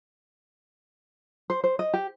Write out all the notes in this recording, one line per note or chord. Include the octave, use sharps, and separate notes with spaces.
C5
C5
D#5
G4